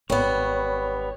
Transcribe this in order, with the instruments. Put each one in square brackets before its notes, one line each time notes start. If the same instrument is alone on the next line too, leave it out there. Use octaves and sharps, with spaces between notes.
[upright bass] G#1 [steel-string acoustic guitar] G3 B3 [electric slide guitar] C#5